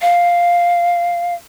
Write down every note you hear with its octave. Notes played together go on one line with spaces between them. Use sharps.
F5